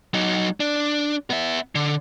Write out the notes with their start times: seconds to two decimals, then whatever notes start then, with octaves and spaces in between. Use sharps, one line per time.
0.14 F#3 D#4
0.60 D4
1.30 B3 E5
1.75 D3